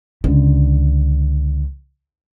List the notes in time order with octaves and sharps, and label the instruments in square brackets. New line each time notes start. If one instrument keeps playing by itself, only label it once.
[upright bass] C#2 D3